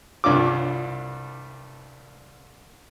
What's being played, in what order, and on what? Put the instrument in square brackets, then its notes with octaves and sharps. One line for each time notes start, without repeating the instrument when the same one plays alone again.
[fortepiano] C2 G2 D4 F4 D6